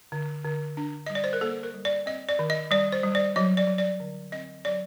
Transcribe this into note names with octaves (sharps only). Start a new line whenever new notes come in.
D3
D3
D4
G3 D#5
D5
C5
A#4
A#3 A4
A#4
G3
D5
C4 D#5
D5
D#3
D#5
G3 D5
C5
G3
D5
F#3 D#5
D5
F#3
D5
D3
C4 D#5
F#3 D5